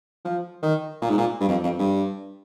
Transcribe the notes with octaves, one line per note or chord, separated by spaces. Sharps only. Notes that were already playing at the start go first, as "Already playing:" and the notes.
F3
D#3
A#2
G#2
A#2
G2
F2
F2
G2